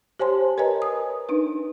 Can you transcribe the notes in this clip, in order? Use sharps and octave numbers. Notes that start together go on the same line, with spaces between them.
G4 C5 C#5 G#5 A5 C6
A#4 B4 C#5 D#5 G#5 A#5
D#6
D4 D#4 B4